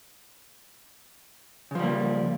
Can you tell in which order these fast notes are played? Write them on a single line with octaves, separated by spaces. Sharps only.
C#3 F3 G3 A#3